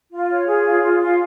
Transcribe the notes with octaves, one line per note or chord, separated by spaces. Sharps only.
F4
C#5
G#4
F4
F4
F4